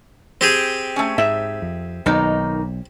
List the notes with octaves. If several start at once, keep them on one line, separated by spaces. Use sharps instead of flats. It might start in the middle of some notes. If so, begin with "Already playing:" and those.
C4 G4 G#4
A3 C#4
G#2 E5
F2
B1 D#3 A#3 D#4